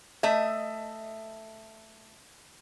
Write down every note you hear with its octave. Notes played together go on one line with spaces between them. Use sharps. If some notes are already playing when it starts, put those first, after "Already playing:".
A3 D#5 E5